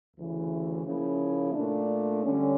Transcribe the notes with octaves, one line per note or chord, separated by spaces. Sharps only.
D2 C#3 E3
C#3 F3 A#3 C#4 E4
A#2 A3 D4
D3 G3 C#4